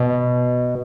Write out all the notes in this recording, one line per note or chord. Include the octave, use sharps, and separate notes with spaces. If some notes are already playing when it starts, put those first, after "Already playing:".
Already playing: B2